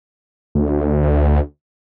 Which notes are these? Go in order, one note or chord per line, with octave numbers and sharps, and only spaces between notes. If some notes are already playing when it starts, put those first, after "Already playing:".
D2